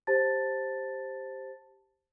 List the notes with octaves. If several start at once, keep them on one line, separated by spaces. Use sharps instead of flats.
G4 C5 A5 A6